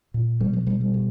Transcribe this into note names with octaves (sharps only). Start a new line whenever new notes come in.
A#2
B2 G3
F#3
B2 G3
G3
B2